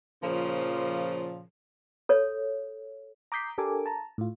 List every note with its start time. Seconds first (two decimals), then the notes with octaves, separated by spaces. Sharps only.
0.23 A#2 C#3 F3
2.09 A4 C#5
3.32 A#5 D6 D#6 G6 B6 C7
3.58 D4 G4 A4 A#4 G#5 D6
3.86 A5 A#5
4.18 A2 F4